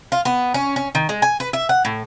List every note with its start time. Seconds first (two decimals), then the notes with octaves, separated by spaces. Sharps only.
0.12 F4
0.25 B3
0.54 C#4
0.76 C#4
0.95 D#3
1.09 G#3
1.22 G#5
1.40 B4
1.53 E5
1.69 F#5
1.85 A2